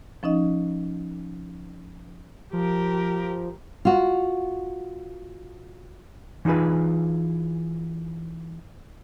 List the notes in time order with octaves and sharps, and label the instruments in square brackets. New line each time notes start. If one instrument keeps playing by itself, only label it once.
[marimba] F3 C#4 D#4 D#5
[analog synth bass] F3 [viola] G4 A#4
[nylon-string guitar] F4 F#4
[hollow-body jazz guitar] E3 D#4 F4 G#4 B4